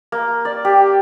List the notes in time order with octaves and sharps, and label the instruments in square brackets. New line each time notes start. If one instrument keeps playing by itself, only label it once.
[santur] A#3
D5
G4